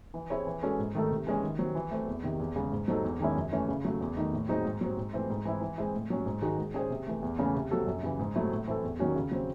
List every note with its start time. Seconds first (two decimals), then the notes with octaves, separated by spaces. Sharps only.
0.14 E3
0.30 C4 E4 G#4 C#5
0.47 E3
0.63 G#3 C#4 F#4 A4
0.79 G#2
0.95 D#3 A3 D#4 A4
1.11 C3
1.27 E3 G#3 C#4
1.43 D#3
1.59 F#3 C4
1.75 E3
1.91 A3 C4
2.07 E2
2.23 C3 D#3
2.40 E2
2.56 C#3 G#3
2.72 G#2
2.88 F#3 C4 D#4 A4
3.04 E2
3.20 D#3 G#3 C#4 E4
3.36 F#2
3.52 E3 A3 C#4
3.68 C#3
3.85 F#3 A3
4.01 E2
4.17 D#3 A3 D#4
4.33 A2
4.49 F#3 C4 D#4 G#4
4.65 G#2
4.81 F#3 C4
4.97 G#2
5.13 E3 A3 C4 E4
5.30 G#2
5.45 E3 C4 E4
5.61 E3
5.78 G#3 C4 E4
5.94 A2
6.10 F#3 C#4
6.26 G#2
6.42 D#3 G#3 D#4 F#4
6.58 G#3
6.74 C#4 G#4 C5
6.90 C3
7.07 E3 A3
7.22 E2
7.39 C#3 E3 A3 C#4
7.55 C3
7.71 F#3 C4 F#4 A4
7.87 F#2
8.03 C#3 E3
8.19 G#2
8.35 F#3 A3 C4 E4
8.51 A2
8.67 E3 C4 E4 A4
8.83 E2
8.99 D#3 F#3 C#4 F#4
9.16 C#3
9.31 F#3 C4